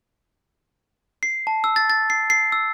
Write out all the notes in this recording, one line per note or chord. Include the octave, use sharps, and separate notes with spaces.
C7
A5
E6
A6
A6
C7
C7
E6